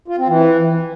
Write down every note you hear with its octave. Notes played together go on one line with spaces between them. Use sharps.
F4
C4
E3